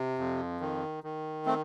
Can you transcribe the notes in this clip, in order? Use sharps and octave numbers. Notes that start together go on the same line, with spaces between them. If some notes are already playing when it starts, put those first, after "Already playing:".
Already playing: C3
F2
D#3
D#3
A3 C4